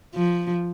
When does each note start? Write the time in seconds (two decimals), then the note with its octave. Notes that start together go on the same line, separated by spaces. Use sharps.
0.14 F3